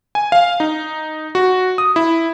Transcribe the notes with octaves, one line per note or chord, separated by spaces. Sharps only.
G#5
F5
D#4
F#4
D#6
E4